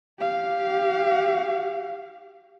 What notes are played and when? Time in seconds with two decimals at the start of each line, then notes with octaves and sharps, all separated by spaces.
0.18 G4 F5